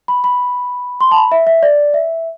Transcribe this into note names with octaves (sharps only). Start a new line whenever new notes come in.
B5
B5
C6
A5
B5
E5
E5
D5
E5